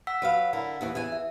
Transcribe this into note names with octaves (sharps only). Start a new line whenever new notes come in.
F#5 E6 B6
F#3 B4 F5
D3 E4 A#4
D#2 E3 C#5
E2 E3 G#5
E5